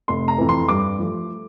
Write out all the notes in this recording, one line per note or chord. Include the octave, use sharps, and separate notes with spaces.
F1 C6
A#5
F2 E3
C6
G2 D6
F3 A3